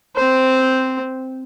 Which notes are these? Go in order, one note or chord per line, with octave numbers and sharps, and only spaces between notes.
C4 C5